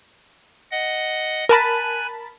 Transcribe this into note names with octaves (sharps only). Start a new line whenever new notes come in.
D#5 F#5
A#4 G#5 A5 B5 F#6